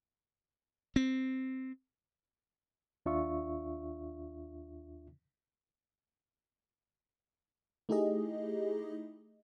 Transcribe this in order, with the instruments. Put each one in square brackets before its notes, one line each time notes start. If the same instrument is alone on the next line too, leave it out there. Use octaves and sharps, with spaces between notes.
[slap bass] C4
[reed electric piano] D#2 D4 F4 E5 C#6
[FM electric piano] A3 D#4 E4 G4 G#4 D#5